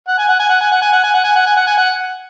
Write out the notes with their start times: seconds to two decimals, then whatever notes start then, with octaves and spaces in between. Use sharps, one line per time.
0.08 F#5
0.19 G#5
0.29 F#5
0.40 G#5
0.50 F#5
0.61 G#5
0.72 F#5
0.82 G#5
0.93 F#5
1.04 G#5
1.14 F#5
1.24 G#5
1.36 F#5
1.46 G#5
1.57 F#5
1.67 G#5
1.78 F#5